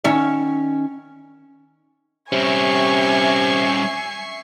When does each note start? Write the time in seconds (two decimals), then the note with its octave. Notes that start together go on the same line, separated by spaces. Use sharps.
0.04 D#3 C#4 E5
2.32 C3 G3 C#4 E5 G#5 C#6 C7